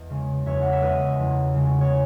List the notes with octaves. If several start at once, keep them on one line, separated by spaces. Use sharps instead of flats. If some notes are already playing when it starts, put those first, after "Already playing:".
Already playing: E2 D#5
C#3 G#3
E2 C#5 E5
F#5
E5
C#3 G#3 B4 D#5
E2
C#3 G#3
C#5